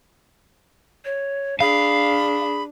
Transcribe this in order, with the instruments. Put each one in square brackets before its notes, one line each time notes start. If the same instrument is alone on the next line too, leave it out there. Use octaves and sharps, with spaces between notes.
[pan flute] C#5
[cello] D4 [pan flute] G#4 [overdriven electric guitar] F5 [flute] B5